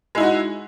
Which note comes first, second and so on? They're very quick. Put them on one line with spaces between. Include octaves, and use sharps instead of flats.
G#3 E4 D#4 F#4